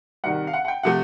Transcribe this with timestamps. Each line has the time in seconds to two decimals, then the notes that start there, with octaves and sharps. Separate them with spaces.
0.24 C2 C3 D#3 F#5
0.47 F5
0.53 F#5
0.65 F#5
0.68 G5
0.83 C3 F3 A3 F#5